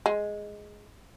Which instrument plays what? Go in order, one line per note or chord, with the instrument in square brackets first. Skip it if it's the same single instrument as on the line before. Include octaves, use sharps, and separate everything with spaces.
[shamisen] G#3